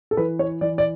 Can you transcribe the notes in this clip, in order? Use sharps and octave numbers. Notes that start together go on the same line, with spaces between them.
A4
E3 B4
C#5
E3 D5
D5